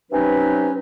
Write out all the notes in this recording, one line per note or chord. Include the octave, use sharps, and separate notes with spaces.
C3 F#3 C#4 D#4 B4